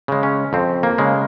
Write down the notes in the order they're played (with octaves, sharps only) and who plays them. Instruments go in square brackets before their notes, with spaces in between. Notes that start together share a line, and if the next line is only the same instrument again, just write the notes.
[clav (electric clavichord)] C#3 G#3
C#4
F2 C4
A#3
C#3 G#3